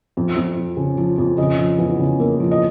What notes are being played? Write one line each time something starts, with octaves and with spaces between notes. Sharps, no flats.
F2
F2
F3
C#3
F3
F2
C#3 D#5
F3
E2
C#3
A#3
F3
D#5